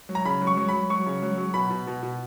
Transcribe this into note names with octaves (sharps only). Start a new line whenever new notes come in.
F#3
A#5
C#3 B5
F#3
C#6
F#3
F#3 B5
F#3 C#6
C#3
F#3
F#3
B2 B5
B2
B2
B2